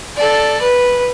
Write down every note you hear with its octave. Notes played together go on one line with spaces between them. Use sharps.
A4 D5
B4